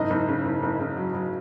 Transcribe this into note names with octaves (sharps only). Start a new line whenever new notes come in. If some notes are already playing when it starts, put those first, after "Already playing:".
Already playing: F#1 G#2 D#5
F#1
C#3
F#1
F#1
C#3
F#3
F#3